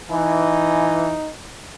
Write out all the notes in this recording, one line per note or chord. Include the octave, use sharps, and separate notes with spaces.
E3 D#4